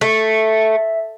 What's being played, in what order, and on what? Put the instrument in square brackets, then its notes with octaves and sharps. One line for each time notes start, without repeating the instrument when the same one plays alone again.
[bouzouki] A3 [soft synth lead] E5